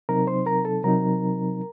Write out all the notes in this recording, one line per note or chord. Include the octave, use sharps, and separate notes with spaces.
C3 F#3 C4 D#4 A#4 A#5
C5 C6
A#4 A#5
A4 A5
C3 F#3 C4 D#4 A#4 A#5